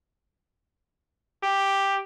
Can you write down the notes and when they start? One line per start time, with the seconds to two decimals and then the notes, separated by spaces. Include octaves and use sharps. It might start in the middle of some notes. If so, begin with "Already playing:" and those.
1.43 G4